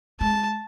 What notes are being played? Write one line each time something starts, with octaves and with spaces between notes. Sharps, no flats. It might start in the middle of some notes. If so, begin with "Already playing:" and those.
G#3 A5